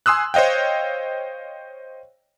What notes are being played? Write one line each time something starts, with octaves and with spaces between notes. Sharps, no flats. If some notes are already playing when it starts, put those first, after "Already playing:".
G#5 C6 D#6 E6 F#6
C5 C#5 D#5 F5 G5